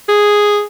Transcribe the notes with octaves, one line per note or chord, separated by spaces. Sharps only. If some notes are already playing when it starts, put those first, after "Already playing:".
G#4